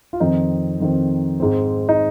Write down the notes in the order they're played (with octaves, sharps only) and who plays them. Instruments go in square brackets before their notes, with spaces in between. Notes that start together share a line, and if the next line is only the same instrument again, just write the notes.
[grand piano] F4
F2 D#3 C4 D#4
F2 D#3 C4
G#2 G#3 C4
D#4